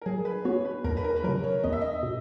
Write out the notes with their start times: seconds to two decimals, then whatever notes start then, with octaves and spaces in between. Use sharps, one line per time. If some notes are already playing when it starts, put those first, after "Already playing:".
0.02 A#4
0.06 F#3 G#4
0.25 B4
0.45 B3 F#4 C#5
0.65 B4
0.84 E2 A#4
0.97 B4
1.04 A#4
1.16 B4
1.24 C#3 F#3 A#4
1.43 C#5
1.63 E2 D#5
1.72 E5
1.81 D#5
2.03 B2